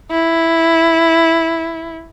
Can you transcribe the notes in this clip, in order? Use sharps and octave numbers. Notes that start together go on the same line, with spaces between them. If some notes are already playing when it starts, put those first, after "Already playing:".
E4